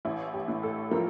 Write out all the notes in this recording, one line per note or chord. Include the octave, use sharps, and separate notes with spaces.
A1 E4
G4
A2
A4
F3 A#4